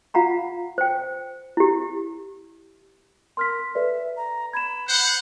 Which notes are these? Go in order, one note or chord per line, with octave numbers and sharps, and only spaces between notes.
F4 F5 F#5 A#5 B5
C5 G5
E4 G4
A#4 C6 F6 B6
A4 B4 D5 E5
A#5
B5 G#6 E7
C5 F#5